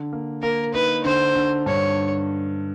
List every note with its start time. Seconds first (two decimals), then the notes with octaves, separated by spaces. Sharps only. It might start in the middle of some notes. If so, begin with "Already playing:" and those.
Already playing: D3
0.13 A#3
0.42 A#3 A#4
0.74 D#4 B4
1.04 D3 C5
1.35 D3
1.66 G2 C#5